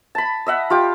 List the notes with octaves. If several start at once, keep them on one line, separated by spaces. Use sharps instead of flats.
A5 B5
D#5 E5 F#5
F4 G4 D6